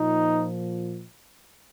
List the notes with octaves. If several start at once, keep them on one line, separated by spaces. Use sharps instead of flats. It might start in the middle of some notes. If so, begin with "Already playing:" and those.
Already playing: A#2 F3 D#4